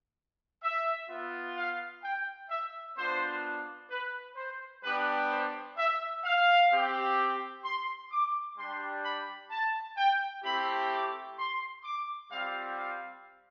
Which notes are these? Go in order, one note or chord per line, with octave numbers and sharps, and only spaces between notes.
E5
B3 F4
F5
G5
E5
B3 D4 F4 C5
B4
C5
G3 B3 D4 G4 B4
C5
E5
F5
C4 G4
C6
D6
G3 D4 G4 C6
B5
A5
G5
A3 C4 E4 G4 B5
D6
C6
D6
G3 C4 F4 F5
F5